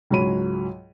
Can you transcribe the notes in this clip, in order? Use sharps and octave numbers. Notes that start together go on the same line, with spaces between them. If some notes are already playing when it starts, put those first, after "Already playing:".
C#2 G#2 F#3 C#5 B5 D#7